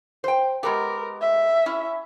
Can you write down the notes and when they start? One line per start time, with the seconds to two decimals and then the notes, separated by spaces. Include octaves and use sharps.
0.24 C5 G5
0.63 G#3 B3 G4 A#4
1.21 E5
1.66 C#4 E4